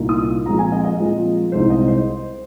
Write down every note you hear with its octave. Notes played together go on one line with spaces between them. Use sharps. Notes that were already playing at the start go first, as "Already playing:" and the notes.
Already playing: C2 A#2 A#3 D#4
D#6
A#2 F3 G#3 C4 A#5
G#5
D#5
D#5
A#2 F3 G#3 C4
C2 C3 G#3 D#4 C5
D#5
C5